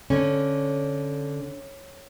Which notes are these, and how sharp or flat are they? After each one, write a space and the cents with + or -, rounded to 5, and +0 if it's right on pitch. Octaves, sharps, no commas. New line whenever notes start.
D3 -10 C#4 -10